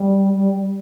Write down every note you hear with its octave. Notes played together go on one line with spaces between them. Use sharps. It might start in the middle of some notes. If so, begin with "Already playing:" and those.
Already playing: G3
G3
G3